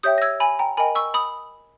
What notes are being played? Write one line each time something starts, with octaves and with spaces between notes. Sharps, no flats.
G4 C#5 E5 G5 D#6 G6
A#6
E6 G#6
G#5 B5
G5 A#5
A#4 D#5 G5 G#5 B5
C#6 E6
B5 D#6